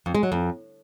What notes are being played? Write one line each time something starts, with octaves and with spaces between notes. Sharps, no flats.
F2
G#3
F#3
F2